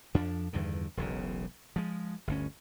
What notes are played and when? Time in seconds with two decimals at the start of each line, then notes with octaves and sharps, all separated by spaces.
0.14 F2 F3 D4
0.53 E2 G2 D3 D#3
0.97 E1 B1 C#3
1.76 F3 G#3
2.27 G1 D2 C#4